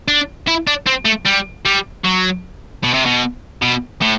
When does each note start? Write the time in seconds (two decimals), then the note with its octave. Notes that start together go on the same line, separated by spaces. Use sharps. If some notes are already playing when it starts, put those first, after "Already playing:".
0.08 D4
0.48 E4
0.67 D4
0.87 C4
1.06 A3
1.26 G3
1.65 G3
2.04 F#3
2.84 B2
2.94 C3
3.06 B2
3.62 B2
4.02 A2